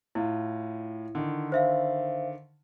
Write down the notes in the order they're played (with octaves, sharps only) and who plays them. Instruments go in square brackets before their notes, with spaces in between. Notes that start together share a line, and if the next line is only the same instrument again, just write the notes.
[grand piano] A2 F4 [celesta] E4
[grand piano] D3 D#3
[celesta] C5 E5 F5